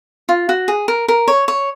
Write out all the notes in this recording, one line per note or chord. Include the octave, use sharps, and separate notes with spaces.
F4
F#4
G#4
A#4
A#4
C#5
C#5